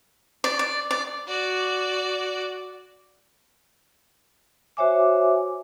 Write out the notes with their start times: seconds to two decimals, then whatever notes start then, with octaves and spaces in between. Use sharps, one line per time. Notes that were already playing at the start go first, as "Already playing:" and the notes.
0.44 D5
0.59 D5
0.91 D5
1.28 F#4 D5
4.77 F#4 C5 C#5 E5 G#5 D6